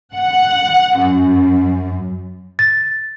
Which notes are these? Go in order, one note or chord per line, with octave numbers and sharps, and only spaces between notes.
F#5
F#2
A6